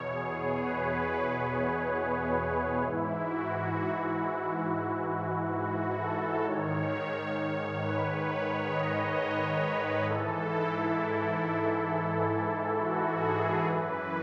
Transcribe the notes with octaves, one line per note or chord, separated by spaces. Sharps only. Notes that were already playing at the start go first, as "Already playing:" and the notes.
Already playing: E2 B2 C#5
G#4
B4
G#2 E3 E4
F#4
F#4
A4
G#2 D#3 C#5
C#5
C#5
B4
C#5
D#5
C#5
B4
G#2 E3 A4
E4
E4
F#4
G#4
F#2 E3 B4